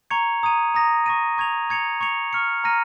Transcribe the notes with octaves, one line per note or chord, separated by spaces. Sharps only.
A#5 C#6 G#6 C#7 F7
A#5 D#6 G#6 D#7
A#5 D#6 A#6
C#6 A#6 D#7
C#6 G#6 F7
C#6 G#6 C#7 F7
C#6 G#6 C#7 F7
C#6 F6 C#7
A#5 F6 A#6 D#7